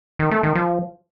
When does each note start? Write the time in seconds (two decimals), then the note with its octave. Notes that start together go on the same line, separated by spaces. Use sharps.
0.19 D#3
0.31 A3
0.43 D#3
0.55 F3